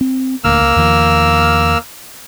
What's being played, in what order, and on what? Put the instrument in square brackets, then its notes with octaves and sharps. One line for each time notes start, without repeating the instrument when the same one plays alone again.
[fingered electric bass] C4
[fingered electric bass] D#1 D2 [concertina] A#3 E6 F6
[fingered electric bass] C#2
E2 D#3 F3